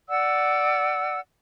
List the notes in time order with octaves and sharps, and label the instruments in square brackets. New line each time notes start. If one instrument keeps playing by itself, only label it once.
[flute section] D5 F#5 E6